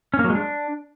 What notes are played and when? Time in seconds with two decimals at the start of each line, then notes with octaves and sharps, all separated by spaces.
0.14 C#4
0.19 A#3
0.24 F#3
0.30 G#3
0.35 D4